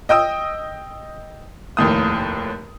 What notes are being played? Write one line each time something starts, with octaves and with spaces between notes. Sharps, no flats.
D#5 G5 D#6 E6
F1 D#2 A2 D#6